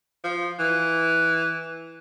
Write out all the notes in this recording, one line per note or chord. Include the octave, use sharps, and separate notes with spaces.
F3
E3